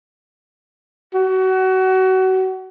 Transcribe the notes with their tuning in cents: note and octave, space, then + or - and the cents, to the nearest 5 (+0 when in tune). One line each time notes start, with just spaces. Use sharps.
F#4 +25